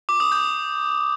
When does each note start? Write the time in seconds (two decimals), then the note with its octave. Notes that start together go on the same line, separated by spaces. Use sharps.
0.09 D6
0.20 D#6
0.32 G6